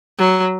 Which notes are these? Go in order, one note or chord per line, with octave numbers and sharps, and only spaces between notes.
F#3